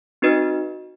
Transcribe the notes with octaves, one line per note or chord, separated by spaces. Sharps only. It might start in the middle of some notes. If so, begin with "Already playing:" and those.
C4 D#4 F#4 B4 D#5